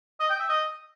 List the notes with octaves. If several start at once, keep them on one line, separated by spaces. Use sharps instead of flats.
D#5
G5
E5
D#5